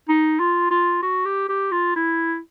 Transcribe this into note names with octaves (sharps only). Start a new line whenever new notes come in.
D#4
F4
F4
F#4
G4
G4
F4
E4